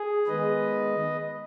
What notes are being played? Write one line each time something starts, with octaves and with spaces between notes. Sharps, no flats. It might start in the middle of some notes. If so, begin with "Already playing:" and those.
Already playing: G#4
D#3 G#3 B3 B4 D#5